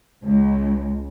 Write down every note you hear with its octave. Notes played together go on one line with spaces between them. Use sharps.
C#2